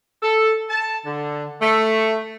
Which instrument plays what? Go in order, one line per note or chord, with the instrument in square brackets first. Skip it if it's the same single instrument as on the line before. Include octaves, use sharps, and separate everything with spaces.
[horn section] A4
A5
D3
A3